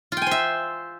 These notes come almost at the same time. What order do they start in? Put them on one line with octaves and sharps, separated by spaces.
F4 G5 G#5 C5 E5